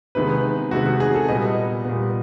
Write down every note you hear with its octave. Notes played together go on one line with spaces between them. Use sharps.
C3 D#3 G#3 B3 B4
C3 D#3 G#3 B3 F#4
F#4
G#4
A4
A#2 G3 B3 D#5
A#2 G3 B3